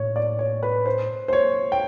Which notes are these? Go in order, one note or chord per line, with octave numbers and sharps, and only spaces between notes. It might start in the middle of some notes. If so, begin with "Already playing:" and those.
Already playing: A2 C#5
D5
C#5
B4
C5
C5
C#5
G5